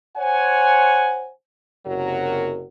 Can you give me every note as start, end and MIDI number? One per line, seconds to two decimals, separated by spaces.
0.17 1.30 72
0.17 1.30 73
0.17 1.30 78
0.17 1.30 80
1.87 2.65 30
1.87 2.65 48
1.87 2.65 54
1.87 2.65 66
1.87 2.65 70